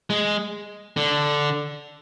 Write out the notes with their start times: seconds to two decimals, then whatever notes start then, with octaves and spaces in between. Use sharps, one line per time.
0.10 G#3
0.96 D3